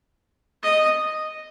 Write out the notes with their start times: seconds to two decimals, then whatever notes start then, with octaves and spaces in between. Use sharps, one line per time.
0.63 D#5